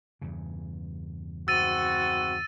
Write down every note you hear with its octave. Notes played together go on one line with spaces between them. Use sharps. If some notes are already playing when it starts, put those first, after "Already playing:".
E2 G2 C#3
G#1 C4 F#4 E6 A6 D#7